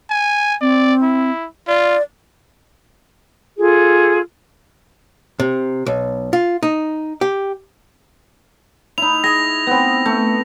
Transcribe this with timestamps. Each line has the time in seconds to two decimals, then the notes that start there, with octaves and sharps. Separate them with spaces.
0.10 G#5
0.61 C4 D5
1.02 E4
1.68 F4 D5
3.57 F4 G#4 A4
5.40 C3
5.86 B1
6.33 F4
6.63 D#4
7.21 G4
8.98 D#4 E4 F7
9.24 G#4 A#6
9.67 B3 C4
10.06 A3